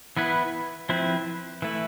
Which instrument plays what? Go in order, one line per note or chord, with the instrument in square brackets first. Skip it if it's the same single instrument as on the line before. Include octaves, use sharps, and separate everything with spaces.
[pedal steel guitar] E3 B3 E4 B4
F3 C4 E4 B4
E3 A3 E4